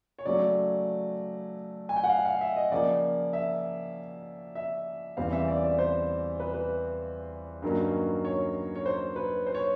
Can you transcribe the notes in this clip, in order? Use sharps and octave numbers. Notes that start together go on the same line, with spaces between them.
C#5
C#3 F#3 A3 D5
G#5
G5
F#5
F5
F5
E5
D#5
C#3 F3 A#3 D5
E5
E5
E2 C#3 E3 G3 C4 F5
E5
D5
D5
C5
B4
B4
G2 D#3 F#3 A#3 C#4
C#5
C#5
C5
B4
C5
C#5